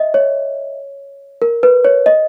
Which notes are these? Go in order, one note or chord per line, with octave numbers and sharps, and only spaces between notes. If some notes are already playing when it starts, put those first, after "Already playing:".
Already playing: D#5 E5
C#5
A#4
B4
C#5
D#5